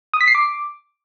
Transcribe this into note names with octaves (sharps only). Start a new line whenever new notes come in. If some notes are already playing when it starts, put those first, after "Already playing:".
D#6
B6
C7
D6